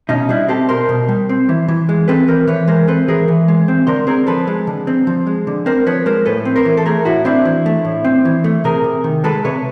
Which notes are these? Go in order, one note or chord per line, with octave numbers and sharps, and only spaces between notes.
B2 C#4 D#4
G3 D4 E4
C4 G4 A4
B2 A#4 C5
B2
G3
C4
E3
E3
G#3
C4 A4 B4
E3 A#4 C5
E3 B4 C#5
G#3 A#4 C5
C4 A4 B4
E3 G#4 A#4
E3
G#3
C4
D3 A#4 C5
C4 G#4 A#4
F3 A4 B4
G#3
D3
C4
F3
G#3
D3
C4 A#4 C5
F3 B4 C#5
G#3 A#4 C5
A2 A4 B4
C4
A#4 C5
E3
A4
A3 G#4 A#4
A2 E4 F#4
C4 D4 E4
E3
A3
A2
C4
E3
A3
C3 G#4 A#4
C3
D#3
G#3 A4 B4
C3 B4 C#5